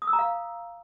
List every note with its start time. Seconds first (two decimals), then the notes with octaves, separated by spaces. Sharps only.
0.02 D#6
0.07 E6
0.13 A#5
0.19 F5